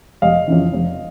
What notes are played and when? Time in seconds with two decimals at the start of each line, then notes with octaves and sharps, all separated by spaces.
0.22 F1 D#5 F5
0.48 F2 C#3 E3
0.73 F1